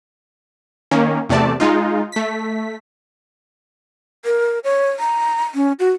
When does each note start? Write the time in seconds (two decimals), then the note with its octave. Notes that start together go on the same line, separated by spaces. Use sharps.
0.91 D#3 A#3 C#4
1.29 E2 C3 A3 D5 A5
1.60 G#3 D#4 F4
2.12 A3 B6
4.25 A#4
4.64 C#5
4.99 A#5
5.55 C#4
5.79 F#4